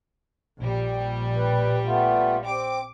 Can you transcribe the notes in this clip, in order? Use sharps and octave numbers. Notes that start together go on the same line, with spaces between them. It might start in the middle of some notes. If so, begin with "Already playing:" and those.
A#1 G3
B4
A3 B3 F4
C4 G5 D6